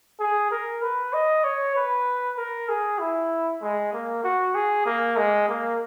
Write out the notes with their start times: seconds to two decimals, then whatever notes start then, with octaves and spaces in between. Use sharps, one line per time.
0.19 G#4
0.51 A#4
0.82 B4
1.13 D#5
1.44 C#5
1.76 B4
2.37 A#4
2.69 G#4
2.99 E4
3.61 G#3
3.93 A#3
4.24 F#4
4.55 G#4
4.86 A#3
5.17 G#3
5.48 A#3